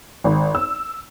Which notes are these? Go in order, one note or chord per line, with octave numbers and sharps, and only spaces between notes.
G#1
E6